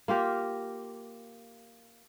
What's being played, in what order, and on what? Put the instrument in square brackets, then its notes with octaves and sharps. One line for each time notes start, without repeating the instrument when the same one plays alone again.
[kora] A#3 F4 G4 A#4